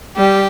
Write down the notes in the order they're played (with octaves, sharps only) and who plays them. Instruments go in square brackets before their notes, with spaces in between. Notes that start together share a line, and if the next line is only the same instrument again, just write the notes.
[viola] G3 [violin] G4